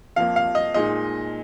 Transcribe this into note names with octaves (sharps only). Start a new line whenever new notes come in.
F2 F3 A#3 F5
F5
D#5
A#2 G#3 D#4 D#5